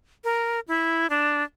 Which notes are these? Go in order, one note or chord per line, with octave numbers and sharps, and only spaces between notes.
A#4
E4
D4